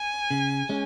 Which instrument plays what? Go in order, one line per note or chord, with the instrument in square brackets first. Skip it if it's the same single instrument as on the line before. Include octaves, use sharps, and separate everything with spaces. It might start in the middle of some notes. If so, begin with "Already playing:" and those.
Already playing: [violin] G#5
[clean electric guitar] C#3
G#3 C#4